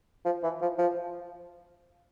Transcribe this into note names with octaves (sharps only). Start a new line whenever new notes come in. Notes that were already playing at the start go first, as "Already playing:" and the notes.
F3
E3
F3
F3